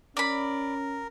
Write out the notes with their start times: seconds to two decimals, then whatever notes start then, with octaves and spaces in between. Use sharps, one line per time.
0.17 C#4 A#4 D5 B5